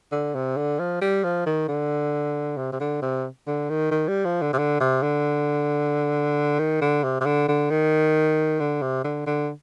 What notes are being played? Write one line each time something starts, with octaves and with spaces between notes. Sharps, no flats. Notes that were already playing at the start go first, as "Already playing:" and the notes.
D3
C3
D3
F3
G3
F3
D#3
D3
C3
C3
D3
C3
D3
D#3
D#3
G3
F3
D3
C3
D3
C3
D3
D#3
D3
C3
C3
D3
D3
D#3
D3
C3
D3
D3